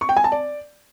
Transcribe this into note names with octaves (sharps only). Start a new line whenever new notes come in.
C#6
G5
G#5
A5
D5